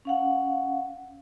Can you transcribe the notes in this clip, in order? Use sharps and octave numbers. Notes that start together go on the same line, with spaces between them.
C#4 F5 F#5